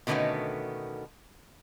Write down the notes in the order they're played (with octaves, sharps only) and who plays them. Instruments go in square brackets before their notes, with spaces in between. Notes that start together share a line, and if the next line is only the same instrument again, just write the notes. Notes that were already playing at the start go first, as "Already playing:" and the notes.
[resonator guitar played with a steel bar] B2 D3 D#3 A3 B3 C#4